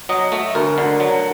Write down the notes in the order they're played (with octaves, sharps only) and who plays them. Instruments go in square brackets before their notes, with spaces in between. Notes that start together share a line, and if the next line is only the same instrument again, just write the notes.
[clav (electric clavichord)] F#3 D#5
A3
D2 A#4
D3
F#3